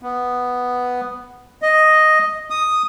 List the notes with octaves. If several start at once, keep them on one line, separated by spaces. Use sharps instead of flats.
B3
D#5
D#6